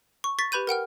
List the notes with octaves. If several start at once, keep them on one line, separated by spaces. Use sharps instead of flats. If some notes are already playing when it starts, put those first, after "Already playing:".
C#6
C#6 A6 B6
G4 B4 B5 G6 D#7
A#4 F#5 G5 F6